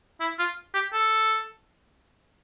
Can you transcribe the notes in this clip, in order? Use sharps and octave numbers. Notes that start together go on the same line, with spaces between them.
E4
F4
G4
A4